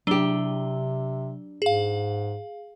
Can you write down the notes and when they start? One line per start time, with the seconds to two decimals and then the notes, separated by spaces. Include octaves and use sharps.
0.07 C3 F#3 D4 G4 G7
1.62 G#2 G#4 F5